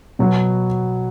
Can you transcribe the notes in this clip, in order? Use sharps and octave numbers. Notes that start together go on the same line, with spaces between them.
B2 F#3 B3 F#4